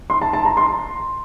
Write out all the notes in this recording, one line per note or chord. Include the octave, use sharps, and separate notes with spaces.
C6
A5
A5
A#5
C6